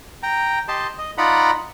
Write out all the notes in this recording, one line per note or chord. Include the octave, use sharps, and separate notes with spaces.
G5 A#5
G4 D#5 A5 C6
D#5
D#4 F4 D5 F#5 A#5 B5